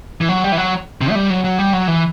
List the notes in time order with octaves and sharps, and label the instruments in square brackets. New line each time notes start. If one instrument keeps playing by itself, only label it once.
[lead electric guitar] E3
F#3
G3
E3
F#3
C3
A3
G3
F#3
F#3
G3
F#3
E3